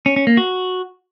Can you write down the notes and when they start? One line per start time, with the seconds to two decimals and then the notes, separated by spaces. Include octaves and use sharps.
0.06 C#4
0.16 C#4
0.27 A#3
0.37 F#4